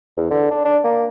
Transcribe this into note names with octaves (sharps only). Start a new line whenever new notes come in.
E2
D3
D4
D4
A#3